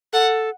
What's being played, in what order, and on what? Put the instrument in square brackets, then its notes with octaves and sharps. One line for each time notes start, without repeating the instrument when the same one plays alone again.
[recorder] A4 [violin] F#5